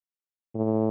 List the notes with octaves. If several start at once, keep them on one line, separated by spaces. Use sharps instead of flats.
A2